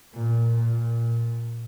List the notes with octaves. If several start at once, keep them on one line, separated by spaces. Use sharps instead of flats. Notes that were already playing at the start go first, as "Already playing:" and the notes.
A#2
A#2